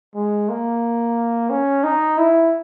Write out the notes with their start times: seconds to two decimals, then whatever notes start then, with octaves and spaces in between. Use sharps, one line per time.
0.15 G#3
0.49 A#3
1.50 C#4
1.84 D#4
2.19 E4